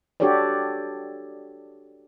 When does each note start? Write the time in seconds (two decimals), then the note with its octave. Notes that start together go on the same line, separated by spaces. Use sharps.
0.20 D4 F#4 G4 A4 C#5 D5